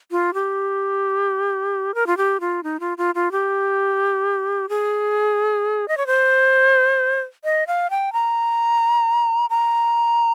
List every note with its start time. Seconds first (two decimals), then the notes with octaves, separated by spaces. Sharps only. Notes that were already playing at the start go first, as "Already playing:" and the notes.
0.11 F4
0.34 G4
1.95 A#4
2.07 F4
2.17 G4
2.40 F4
2.63 D#4
2.80 F4
2.98 F4
3.15 F4
3.32 G4
4.69 G#4
5.88 D#5
5.97 C#5
6.07 C5
7.44 D#5
7.67 F5
7.90 G5
8.13 A#5
9.50 A#5